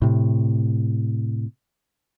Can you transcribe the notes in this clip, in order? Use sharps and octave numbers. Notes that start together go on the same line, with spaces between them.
A2 C3